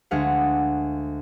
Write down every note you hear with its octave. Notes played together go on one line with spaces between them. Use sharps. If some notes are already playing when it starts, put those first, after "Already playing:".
D2 G#3 G#4 F5 F#5